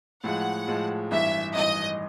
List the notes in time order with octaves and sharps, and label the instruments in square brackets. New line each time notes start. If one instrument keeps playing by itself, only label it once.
[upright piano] A2 F3 G#3 [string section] F#5
[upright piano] A2 F3 G#3
[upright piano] G#1 G2 E3 [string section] E5
[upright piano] G#1 G2 E3 [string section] D#5